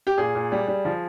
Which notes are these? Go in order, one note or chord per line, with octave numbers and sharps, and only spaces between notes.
G4
A#2 G#4
A#2
G3
G3
F3